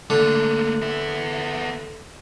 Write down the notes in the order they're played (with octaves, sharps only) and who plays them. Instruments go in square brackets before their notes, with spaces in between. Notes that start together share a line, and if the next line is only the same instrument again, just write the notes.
[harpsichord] D3 [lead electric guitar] A3 A#3
[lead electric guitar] B3 E5